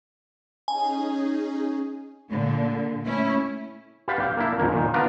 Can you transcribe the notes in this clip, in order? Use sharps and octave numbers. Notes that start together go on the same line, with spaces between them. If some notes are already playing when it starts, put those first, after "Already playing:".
C#4 D#4 G#4 G#5
A#2 D3
A3 C#4 E4
G4 B4 D5 F5 F#5
G4 F5
A#3 D4 E4
F2 A#2 D3 D#3 A#3
A#2 D#3
B3 D4 F4 A#4 B4 F5